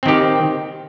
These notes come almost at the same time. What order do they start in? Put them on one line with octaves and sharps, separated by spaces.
C4 D#3 G4